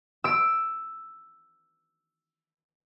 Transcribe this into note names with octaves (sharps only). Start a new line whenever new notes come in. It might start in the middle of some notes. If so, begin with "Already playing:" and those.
E6 D7